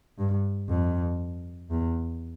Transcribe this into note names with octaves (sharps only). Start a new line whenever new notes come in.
G2
F2
E2